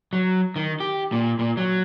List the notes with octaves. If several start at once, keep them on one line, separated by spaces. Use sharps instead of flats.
F#3
D#3
G4
A#2
A#2
F#3